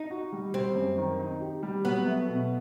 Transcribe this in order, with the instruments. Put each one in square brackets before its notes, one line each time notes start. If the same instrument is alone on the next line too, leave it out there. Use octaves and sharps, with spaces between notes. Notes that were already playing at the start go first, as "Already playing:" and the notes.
Already playing: [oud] D#4
[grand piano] F#4
G3
[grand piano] G3 [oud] C4
[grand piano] F#2
D#3
D#4
G4
G3
[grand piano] F#3 [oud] B3
[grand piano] A3
B2